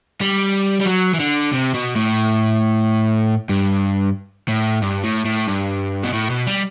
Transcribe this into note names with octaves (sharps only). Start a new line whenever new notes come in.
G3
G3
F#3
E3
D3
C3
B2
A2
G2
A2
G2
A2
A2
G2
B2
A2
B2
G3